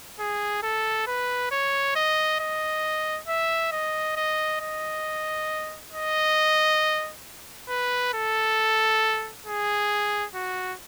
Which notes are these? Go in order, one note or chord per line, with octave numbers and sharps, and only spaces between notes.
G#4
A4
B4
C#5
D#5
D#5
E5
D#5
D#5
D#5
D#5
B4
A4
G#4
F#4